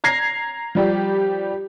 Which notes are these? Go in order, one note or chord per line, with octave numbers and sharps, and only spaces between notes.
A#5 G#6 A#6 C7
F3 G3 G4